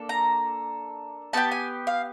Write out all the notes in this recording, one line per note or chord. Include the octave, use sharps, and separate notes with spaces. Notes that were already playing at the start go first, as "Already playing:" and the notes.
Already playing: A#3 D4 A4
A#5
B3 D#4 G4 A5
G#5
F5